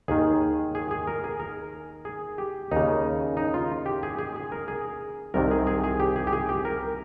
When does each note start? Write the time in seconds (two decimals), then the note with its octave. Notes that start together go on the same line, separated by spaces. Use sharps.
0.08 D#2 D#3 G#4
0.75 G#4
0.91 G#4
1.07 A#4
1.24 G#4
1.40 A#4
2.05 G#4
2.38 G4
2.72 D#2 C#3 D#4
3.37 D#4
3.54 F4
3.86 G4
4.03 G#4
4.19 G#4
4.36 G#4
4.52 A#4
4.68 G#4
5.34 C2 C3 D#3 A#4
5.51 G#4
5.67 G#4
5.84 G#4
6.00 G4
6.16 G#4
6.27 G4
6.33 G#4
6.49 G4
6.65 A#4